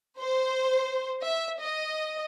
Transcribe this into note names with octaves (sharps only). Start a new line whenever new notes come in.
C5
E5
D#5